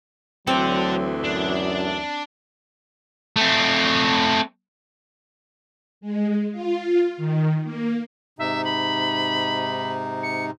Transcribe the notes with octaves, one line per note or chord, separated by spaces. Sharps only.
D2 E3 F#3 C4 A4 D5
F#2 D4
A3 C4
G#3
F4
D#3
A#3
G#2 C3 D#4 E5
B5
C#7